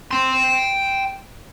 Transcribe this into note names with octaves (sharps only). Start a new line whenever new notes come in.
G5 C6